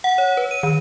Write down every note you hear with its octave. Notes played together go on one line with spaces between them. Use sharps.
F#5
C#5
B4
D#7
D#3